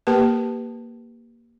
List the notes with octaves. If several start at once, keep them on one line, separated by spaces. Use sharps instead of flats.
A#3 G4 A#4 B4 A5